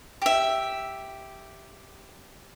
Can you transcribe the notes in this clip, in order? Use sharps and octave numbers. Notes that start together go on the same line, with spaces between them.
G4 E5